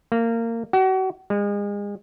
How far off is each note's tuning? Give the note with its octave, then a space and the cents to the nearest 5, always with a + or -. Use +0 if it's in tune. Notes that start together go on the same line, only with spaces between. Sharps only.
A#3 -25
F#4 +35
G#3 -35